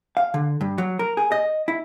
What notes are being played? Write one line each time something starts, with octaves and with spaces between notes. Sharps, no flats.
F5
D3
G2
F#3
A#4
G#4
D#5
E4